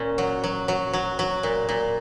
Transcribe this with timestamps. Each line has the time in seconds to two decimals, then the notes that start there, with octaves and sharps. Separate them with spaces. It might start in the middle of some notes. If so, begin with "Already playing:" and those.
Already playing: A#2 C#4
0.18 F#3
0.44 F#3
0.68 F#3
0.93 F#3
1.19 F#3
1.43 A#2
1.69 A#2